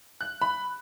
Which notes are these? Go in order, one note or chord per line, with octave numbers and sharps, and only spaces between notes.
F#6
B5